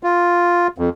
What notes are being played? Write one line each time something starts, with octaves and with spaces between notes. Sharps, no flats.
F4
F2